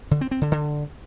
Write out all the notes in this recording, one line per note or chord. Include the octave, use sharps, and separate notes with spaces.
D3
C4
C4
D3
D3